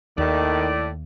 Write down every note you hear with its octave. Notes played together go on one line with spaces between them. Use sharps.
D#2 A2 D#3 D5